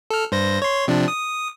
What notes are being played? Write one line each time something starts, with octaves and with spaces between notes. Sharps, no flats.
A4 F6
G2 C5 A#6
C#5 C6
C3 F3 D4
D#6